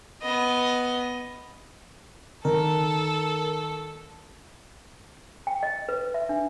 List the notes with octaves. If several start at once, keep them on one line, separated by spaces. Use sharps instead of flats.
B3 D#5
D#3 A4 A#4
G5
D#5
B4
E5
D4